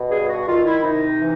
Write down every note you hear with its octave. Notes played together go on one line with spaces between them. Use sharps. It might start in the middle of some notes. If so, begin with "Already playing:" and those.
Already playing: B2
G2 G#4
F#4
D#3 F4
E4
C3 D#4
E3